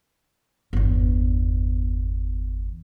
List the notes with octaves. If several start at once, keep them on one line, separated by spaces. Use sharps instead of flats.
G1 E2